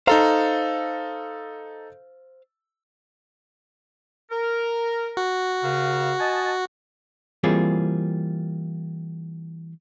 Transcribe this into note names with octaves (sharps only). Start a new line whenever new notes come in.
D#4 A4 C5 F5 A#5
A#4
F#4
D#2 C#3 F5
D#5 G#5 A5
E3 G3 A#3 C4 F4 G#4